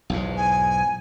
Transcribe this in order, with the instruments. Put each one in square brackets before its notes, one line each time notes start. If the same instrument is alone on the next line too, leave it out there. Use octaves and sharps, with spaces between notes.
[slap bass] B1 E2 G#2
[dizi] G#5